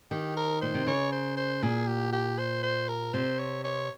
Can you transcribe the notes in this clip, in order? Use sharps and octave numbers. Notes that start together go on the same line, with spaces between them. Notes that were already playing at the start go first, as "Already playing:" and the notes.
D#3 G4
A#4
A#2 C5
C3
C#3 C#5
C5
C5
A#2 G#4
G4
G4
C5
C5
A#4
C3 C5
C#5
C#5